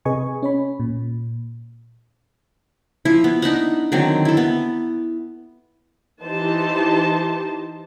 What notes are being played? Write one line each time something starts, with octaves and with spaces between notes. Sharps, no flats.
C3 G#4 B4 D#5 G#5 C#6
C#4 C#5 B5
A#2
F3 E4
B3
D4 D#4 E5 F#5
D3 D#3 F#3 C4
E4 A4
B3
E3 D#4 G4 C5 A5